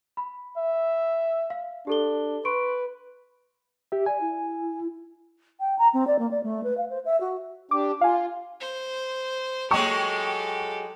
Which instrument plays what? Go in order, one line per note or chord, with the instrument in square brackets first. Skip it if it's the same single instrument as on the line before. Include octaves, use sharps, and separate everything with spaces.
[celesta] B5
[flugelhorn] E5
[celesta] F5
[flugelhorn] D4 [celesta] G4 A4 G7
[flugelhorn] B4 [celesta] C6 C#6 D7
[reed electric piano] G4 E5
[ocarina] D5 [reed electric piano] G#5
[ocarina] E4
[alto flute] G5
A#5
C4
D5
A#3
D5
A3
B4
F5
C5
E5
F#4
[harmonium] D4 G4 [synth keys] D6
[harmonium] F4 [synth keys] F5 G#5
[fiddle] C5
[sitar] F#3 G#3 [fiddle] G4 A4 [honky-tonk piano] G5 C#6